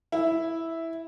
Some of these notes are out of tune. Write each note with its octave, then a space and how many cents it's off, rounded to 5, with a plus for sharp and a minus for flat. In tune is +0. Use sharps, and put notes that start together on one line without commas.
E4 -5